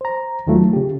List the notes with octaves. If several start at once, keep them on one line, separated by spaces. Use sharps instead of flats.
C5 A#5
D#2 D#3 F#3 A3 F4
C#3 G4